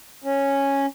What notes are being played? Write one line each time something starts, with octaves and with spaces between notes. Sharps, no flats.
C#4